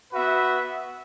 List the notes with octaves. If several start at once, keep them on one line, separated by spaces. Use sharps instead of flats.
B3 F#4 B4 E5